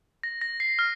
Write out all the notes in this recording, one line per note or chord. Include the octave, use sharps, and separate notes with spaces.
A#6
A#6
C7
F6